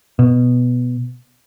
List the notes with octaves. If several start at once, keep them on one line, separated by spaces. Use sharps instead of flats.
B2